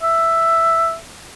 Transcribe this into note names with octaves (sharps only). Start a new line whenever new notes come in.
E5